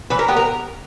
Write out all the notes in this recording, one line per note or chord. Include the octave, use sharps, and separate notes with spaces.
E3 B4
A#4
B3 G4
A#4